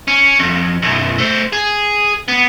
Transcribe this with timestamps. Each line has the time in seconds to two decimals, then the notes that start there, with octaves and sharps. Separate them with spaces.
0.08 C#4
0.39 F2
0.82 B1 F#2
1.18 A3 C5
1.53 G#4
2.28 B3